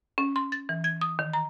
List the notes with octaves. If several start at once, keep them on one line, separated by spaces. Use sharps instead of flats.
C#4
C6
A6
E3
G#6
D#6
D#3
A#5